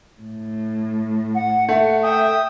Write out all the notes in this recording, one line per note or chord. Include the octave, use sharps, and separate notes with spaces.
A2
F#5
A3 F#5
E5 G5 D#6